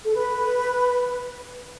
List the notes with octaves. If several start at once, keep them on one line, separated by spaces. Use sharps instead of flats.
A4
B4